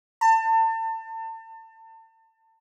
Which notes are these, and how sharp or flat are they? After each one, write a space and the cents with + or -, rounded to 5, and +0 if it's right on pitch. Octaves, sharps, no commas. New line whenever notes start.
A5 +35